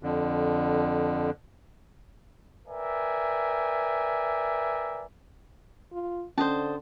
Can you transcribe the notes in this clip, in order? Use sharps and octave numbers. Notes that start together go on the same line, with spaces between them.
F2 D3
A#4 B4 D5 E5 G5 G#5
F4
D3 C#4 C5 D#5 A5